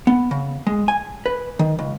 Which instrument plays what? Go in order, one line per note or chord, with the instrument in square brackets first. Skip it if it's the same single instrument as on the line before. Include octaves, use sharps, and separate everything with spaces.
[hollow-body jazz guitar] B3
C#3
G#3
G#5
B4
D#3
C#2